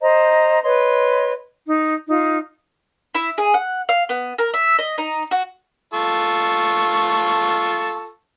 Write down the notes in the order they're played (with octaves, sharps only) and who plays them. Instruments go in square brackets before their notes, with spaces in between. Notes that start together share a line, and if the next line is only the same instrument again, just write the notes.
[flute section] C5 D#5 A#5
B4 C#5 D#5 C6
D#4
D#4 F4
[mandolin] E4
G#4
F#5
F5
B3
A#4
E5
D#5
D#4
F#4
[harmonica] F4 A4 C#6